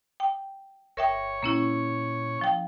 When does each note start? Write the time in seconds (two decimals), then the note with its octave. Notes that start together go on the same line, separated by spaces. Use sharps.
0.20 G5
0.97 G1 A#4 C#5 E5 G5
1.43 A#2 A#3 C#4 E4
2.41 F3 G5